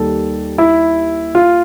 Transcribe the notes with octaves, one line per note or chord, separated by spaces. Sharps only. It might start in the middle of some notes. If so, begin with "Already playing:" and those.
Already playing: D#2 D#3 G3 A4
E4
F4